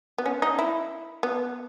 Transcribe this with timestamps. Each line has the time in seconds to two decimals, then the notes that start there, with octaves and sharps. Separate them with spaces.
0.18 B3
0.26 C#4
0.42 D#4
0.59 E4
1.23 B3